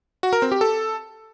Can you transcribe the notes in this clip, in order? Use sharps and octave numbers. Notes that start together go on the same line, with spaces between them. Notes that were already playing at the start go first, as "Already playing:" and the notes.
F#4
A#4
C4
G4
A4